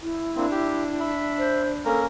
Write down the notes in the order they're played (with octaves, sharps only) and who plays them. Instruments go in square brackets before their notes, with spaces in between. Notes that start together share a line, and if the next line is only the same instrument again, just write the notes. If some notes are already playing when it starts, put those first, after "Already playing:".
[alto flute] E4
[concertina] A#3 C4 [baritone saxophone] D4
[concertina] G4
E5 B5
[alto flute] C5
[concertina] A#3 C#4 A#4 [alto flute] A4